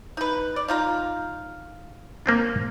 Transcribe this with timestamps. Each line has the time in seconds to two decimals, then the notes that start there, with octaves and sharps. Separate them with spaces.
0.17 D#4 B4
0.56 D5
0.68 D#4 F4 A#5
2.26 A#3 C4 D4